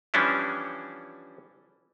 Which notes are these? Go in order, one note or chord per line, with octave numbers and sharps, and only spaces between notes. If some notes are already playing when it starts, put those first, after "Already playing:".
E3 F3 G3 C#4 D4 E4